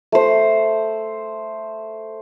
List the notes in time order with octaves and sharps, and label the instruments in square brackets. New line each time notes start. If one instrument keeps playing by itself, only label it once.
[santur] A3 C5